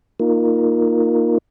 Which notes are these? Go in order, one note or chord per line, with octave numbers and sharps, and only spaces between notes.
A#3 D#4 F4 A#4